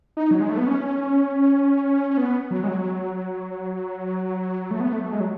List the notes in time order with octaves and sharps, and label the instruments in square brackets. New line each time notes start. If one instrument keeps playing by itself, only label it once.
[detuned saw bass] D#4
F#3
G#3
A3
B3
C#4
C#4
B3
F#3
G#3
F#3
A3
B3
A3
A3
G#3
F#3